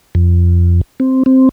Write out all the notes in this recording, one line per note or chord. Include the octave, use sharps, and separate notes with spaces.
F2
C4
C4